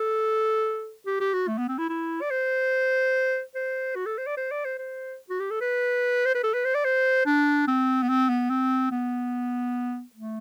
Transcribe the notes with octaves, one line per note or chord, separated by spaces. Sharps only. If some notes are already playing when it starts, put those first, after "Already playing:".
Already playing: A4
G4
G4
F#4
A3
B3
C4
E4
E4
D5
C5
C5
F#4
A4
C5
D5
C5
D5
C5
C5
F#4
G4
A4
B4
C5
B4
A4
B4
C5
D5
C5
D4
C4
B3
C4
B3
C4
B3
A3